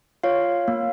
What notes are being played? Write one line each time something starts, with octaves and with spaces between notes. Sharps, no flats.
F4 C#5 F5
A#3